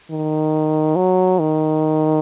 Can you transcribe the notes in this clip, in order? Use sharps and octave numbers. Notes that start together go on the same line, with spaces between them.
D#3
F#3
D#3